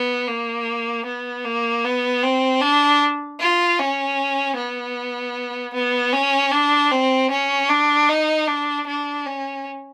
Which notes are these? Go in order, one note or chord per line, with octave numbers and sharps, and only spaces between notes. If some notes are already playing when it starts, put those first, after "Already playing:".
Already playing: B3
A#3
B3
A#3
B3
C4
D4
F4
C#4
B3
B3
C#4
D4
C4
C#4
D4
D#4
D4
D4
C#4